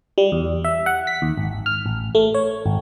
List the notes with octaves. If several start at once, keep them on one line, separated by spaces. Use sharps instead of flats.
G3
E2
E5
F#5
B6
D#2
G#1
F6
A1
A3
C#5
G#1